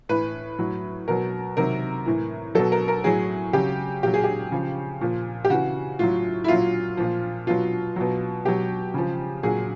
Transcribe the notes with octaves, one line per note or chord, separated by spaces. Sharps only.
A2 E3 B4
A2 F#3
B2 F#3 A#4
C3 D#3 F#3 A#4
A2 E3
B2 F#3 A4
A#4
A#4
A2 F#3 G#4
C#3 F#3 G4
A#2 F#3 G4
G#4
G4
C#3 F3
A#2 F3
G4
C#3 E3 F#4
A2 F#3 F4
E4
A#2 F#3 F4
A#2 F3
B2 F#3 F4
B2 F#3
B2 F#3 G4
C#3 F3
A#2 F#3 G#4